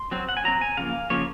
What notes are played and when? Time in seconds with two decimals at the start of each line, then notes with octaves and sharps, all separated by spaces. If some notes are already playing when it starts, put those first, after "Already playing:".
Already playing: C6
0.11 F#3 C4
0.29 F#5
0.37 G#5
0.44 F#3 C4 A#5
0.61 G#5
0.77 C#3 F3 A#3 F5
1.10 C#3 F3 A#3 C#5